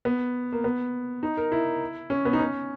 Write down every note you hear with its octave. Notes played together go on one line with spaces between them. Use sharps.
B3
A#3
B3
D#4
A#4
E4
C#4
B3
D#4
C#4